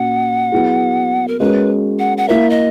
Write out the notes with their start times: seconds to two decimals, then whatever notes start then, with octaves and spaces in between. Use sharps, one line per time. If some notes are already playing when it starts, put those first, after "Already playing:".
Already playing: A#2 A#3 C#4 F#4 F#5
0.52 F#3 B3 E4 G#4
1.28 A#4
1.40 G#3 C#4 F#4 A#4 B4
1.99 F#5
2.18 F#5
2.29 A#3 E4 A#4 E5
2.50 D#5